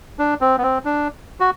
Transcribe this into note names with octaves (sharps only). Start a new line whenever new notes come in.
D4
C4
B3
C4
D4
F#4